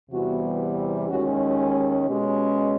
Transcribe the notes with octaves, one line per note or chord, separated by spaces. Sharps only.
E2 C3 E3 G3 B3 F#4
D#2 D#3 G#3 C#4 F#4
B2 G#3 C#4 G4